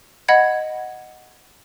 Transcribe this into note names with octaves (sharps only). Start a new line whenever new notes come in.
D#5 F#5 B5 G#6